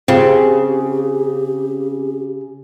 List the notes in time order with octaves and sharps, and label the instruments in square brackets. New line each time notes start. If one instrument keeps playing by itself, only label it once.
[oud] C#3 [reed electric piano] C4 F4 [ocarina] G4